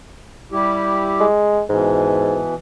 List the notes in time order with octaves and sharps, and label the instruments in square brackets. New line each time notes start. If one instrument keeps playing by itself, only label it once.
[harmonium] G3 E4 G4
[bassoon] G#3
[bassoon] G#2 [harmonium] B2 E3